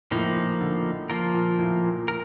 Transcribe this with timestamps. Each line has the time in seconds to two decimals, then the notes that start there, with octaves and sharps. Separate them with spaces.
0.11 A2 F3 A#3 D#4
0.36 A#2
0.61 D3
1.10 F3 A#3 F4 A#4
1.34 A#2
1.59 A2
1.84 A#2
2.08 A#2 A#4